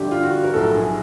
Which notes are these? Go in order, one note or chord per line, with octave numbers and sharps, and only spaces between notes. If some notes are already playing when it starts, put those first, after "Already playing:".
Already playing: G1 G2 D3 G4
F4
F#4
A#4
B1 A2 F3 A4
G#4